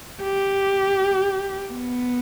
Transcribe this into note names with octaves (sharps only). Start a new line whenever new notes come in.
G4
B3